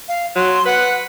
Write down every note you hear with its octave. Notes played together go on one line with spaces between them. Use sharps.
F5
F#3 C6
B4 F#5